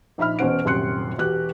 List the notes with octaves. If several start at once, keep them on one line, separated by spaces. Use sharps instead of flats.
A#1 D#4 E5 B5 F6
E1 B2 C#4 C5 F#5 D7
D#1 F#2 C3 C6 F#6 C#7
E1 F#4 G4 F#6